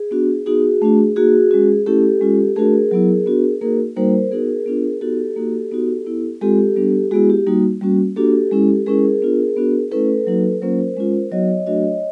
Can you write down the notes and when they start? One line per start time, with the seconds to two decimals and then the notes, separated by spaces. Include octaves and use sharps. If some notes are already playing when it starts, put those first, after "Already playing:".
Already playing: G#4
0.11 B3 D4 F#4
0.46 B3 D#4 F#4 G#4
0.82 A3 D4 F#4
1.16 A#3 D#4 F#4 G#4
1.51 G#3 C#4 F#4
1.86 A3 C#4 E4 G4 A4
2.21 G#3 C#4 F4
2.56 A3 D4 F#4 G#4 A#4
2.91 F#3 B3 E4
3.26 B3 D4 F#4
3.61 A#3 D#4 F#4 G#4 A#4
3.96 G3 A#3 D#4 F#4 A#4 C5
4.31 B3 D#4 F#4 G#4 A#4
4.66 B3 D4 F4
5.01 B3 D#4 F#4 G4 A4
5.36 A#3 D#4 F#4
5.72 B3 D#4 F#4
6.06 B3 E4
6.41 G#3 C4 F4 G4 A4
6.76 G3 B3 D4
7.11 G#3 B3 E4 F#4 G#4
7.30 G4
7.46 G3 A#3 D#4 F#4
7.81 G3 A#3 C#4 F#4
8.16 A#3 D4 F#4 G4 A4
8.52 G#3 C#4 E4
8.86 G#3 C#4 E4 G#4 A#4
9.22 B3 D4 F4
9.57 B3 D4 F#4
9.91 A3 C#4 E4 A4 B4
10.27 F#3 A#3 D#4 F#4
10.61 F#3 A#3 C#4 F4 A#4 C5
10.96 G#3 C#4 F4
11.32 F#3 B3 D#4 F#4 C#5 D#5
11.67 F#3 A3 D4 F#4 C#5 D#5